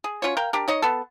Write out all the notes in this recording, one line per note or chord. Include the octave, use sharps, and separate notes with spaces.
G#4
C#4 F4 F#4 C#5
A#4 F5 G5
D4 G4 A#4
D#4 C#5 D#5
B3 A4